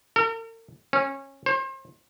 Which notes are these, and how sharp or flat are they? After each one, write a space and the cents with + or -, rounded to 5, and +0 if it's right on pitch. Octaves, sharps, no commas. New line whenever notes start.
A#4 -45
C#4 -20
C5 +35